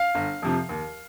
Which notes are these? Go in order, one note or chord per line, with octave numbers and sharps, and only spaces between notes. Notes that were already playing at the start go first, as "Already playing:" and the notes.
Already playing: F5
G1
F2 C3 F3
D#2